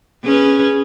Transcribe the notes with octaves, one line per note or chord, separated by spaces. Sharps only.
C#4 G#4 B4